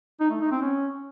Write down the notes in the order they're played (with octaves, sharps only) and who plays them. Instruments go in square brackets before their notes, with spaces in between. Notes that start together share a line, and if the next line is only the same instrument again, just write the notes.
[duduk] D#4
A3
D#4
C4
C#4